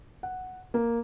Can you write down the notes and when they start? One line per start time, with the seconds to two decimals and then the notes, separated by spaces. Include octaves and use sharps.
0.23 F#5
0.74 A#3